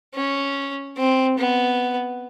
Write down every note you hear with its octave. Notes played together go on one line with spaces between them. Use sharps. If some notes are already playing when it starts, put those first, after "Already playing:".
C#4
C4
B3